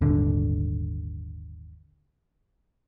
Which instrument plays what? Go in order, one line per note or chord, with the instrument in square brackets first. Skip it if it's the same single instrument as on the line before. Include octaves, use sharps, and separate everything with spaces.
[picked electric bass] D#1 G#1 D3